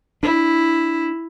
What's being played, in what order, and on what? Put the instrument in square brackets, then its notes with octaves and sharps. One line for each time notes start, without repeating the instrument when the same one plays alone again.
[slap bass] D4 [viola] E4